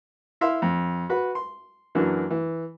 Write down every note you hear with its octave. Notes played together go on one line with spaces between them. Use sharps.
E4 E5 F5 C6 F6
F2
F#4 B4 B5
C6
F#2 E3 F#3 A#3 D4
E3